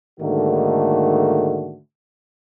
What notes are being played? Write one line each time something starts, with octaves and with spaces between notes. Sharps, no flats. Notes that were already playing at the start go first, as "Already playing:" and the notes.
G#2 D3 D#3 A3 A#3 F#4